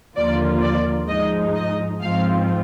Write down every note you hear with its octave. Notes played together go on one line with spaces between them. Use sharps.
D#2 D3 F3 A#3 F4 D5
D5
G#2 F3 G#3 D#4 D#5
D#5
G#2 F3 C4 F4 F5